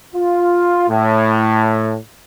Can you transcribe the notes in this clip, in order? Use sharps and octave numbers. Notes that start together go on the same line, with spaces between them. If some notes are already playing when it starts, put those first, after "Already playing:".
F4
A2